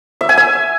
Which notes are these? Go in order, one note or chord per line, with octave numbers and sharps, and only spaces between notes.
E5
G#5
E5